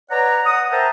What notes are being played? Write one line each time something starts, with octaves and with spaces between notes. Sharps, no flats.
B4 C#5 D5 F#5 A#5
F#5 D#6
A#4 C5 E5 G5 A5 A#5